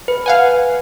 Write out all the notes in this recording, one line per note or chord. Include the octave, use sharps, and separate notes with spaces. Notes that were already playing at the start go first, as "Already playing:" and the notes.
B4
F5 F#5 G#5